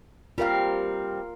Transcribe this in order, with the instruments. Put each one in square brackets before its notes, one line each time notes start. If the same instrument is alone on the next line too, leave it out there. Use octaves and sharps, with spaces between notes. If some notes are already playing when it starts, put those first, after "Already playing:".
[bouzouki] G3 B3 C4 [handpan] F4 A#4 F5